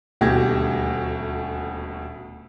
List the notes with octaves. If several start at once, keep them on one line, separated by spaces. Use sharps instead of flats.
D#1 D2 B2 G4 G#6 A#6